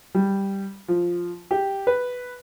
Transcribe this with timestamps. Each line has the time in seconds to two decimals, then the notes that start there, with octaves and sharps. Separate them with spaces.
0.15 G3
0.88 F3
1.51 G4
1.87 B4